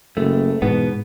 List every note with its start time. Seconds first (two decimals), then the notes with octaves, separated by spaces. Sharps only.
0.17 F#1 A3
0.62 E2 G#2 B2 B3